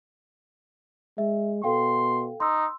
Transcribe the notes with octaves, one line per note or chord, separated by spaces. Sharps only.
G#3 E5
B2 A4 F5 G5 C6
D#4 C6 E6